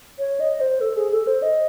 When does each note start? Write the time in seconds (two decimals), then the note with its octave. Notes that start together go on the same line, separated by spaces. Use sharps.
0.19 C#5
0.40 D#5
0.60 C5
0.81 A4
0.96 G#4
1.12 A4
1.27 C5
1.42 D#5